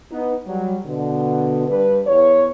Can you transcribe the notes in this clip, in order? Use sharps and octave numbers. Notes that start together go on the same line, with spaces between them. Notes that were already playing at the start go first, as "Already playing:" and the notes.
B3 D#4
F#3 G3
B2 D3
G2 B4
E2 C#5